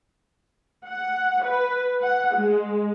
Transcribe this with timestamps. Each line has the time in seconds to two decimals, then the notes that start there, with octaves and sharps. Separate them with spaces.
0.86 F#5
1.44 B4
2.02 F#5
2.35 G#3